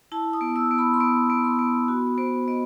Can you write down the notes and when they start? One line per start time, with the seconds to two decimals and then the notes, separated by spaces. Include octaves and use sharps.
0.12 E4 A5
0.33 D#6
0.41 B3
0.56 E6
0.71 B3
0.78 B5
0.94 C6
1.00 B3 D#6
1.30 B3
1.45 C6
1.59 B3
1.88 F#4 B5
2.18 B3 C5
2.48 B3 D#5